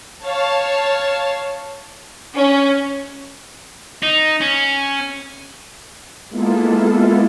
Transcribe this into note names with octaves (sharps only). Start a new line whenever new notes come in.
C#5 F5 A5
C#4
D#4
C#4
G#3 A#3 B3 E4 F4 A4